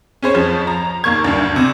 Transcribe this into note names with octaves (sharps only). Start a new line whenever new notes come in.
C#4 G#4 C5 C#5
F2 F3
A#5
D#2 A#3 C#6 G#6
D2 G2
C3